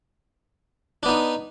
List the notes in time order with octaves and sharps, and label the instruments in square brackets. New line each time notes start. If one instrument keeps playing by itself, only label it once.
[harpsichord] D4
B3
D#4